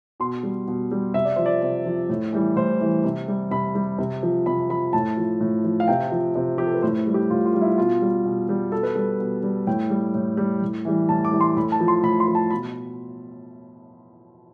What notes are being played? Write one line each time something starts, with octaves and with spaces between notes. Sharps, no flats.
B2 C6
G3
B2
G3
C3 E5
D5
F3 C5
D5
C3
F3
A2
E3 G3
A2 C5
E3 G3
C3
G3
C3 B5
G3
C3
F3
C3 B5
F3 B5
A2 A5
F3
A2
F3
F5
C3 G5
F3
C3
F3 G4
A4
B4
A2 C5
G3
G4
A2 F4
F4
G3
E4
B2 F4
G3
B2
G3
B2 A4
B4
G3 A4
B2
G3
A2 G5
G3
A2
G3
A2
E3 G3
A2 A5
D6
E3 G3
C6
A2 B5
A5
F3
C6
A2 B5
C6
F3
A5
B2 B5